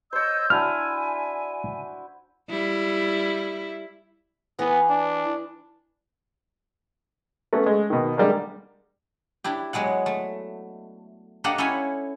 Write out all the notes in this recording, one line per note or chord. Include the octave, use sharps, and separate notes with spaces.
C5 C#5 D#5 E6 G6
D4 E4 F#4 G#5 F6
G3 E4
E3 B3
D4
A3 B3 C#4
G#3
B2 D#3
D3 G3 G#3 A#3
D4 E4 G4
F#3 G#3 B3 F#5
A3
A#3 D4 G4 A4 D#5 F#5
C#4 E4 A4 C#5 G#5 B5